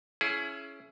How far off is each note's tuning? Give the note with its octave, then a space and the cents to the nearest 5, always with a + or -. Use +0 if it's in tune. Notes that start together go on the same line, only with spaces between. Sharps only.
C#4 +5 E4 +20 G#4 +25